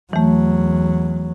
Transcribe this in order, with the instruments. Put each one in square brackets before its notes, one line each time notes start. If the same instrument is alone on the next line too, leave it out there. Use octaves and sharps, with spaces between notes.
[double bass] E2 F#3 [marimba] E3 A3